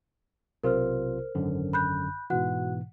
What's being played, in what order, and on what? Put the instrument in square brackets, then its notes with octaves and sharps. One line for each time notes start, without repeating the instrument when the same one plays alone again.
[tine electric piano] B1 C3 F4 [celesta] A#4 C5 F6
[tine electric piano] G#1 F#2 D3
[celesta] B5 F#6 G6
[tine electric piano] G#2 B2 E3 [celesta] F#4 F#5 F#6